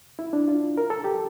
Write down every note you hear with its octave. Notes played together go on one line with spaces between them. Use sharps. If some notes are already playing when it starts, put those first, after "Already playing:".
E4
D4
F4
A#4
A4
G4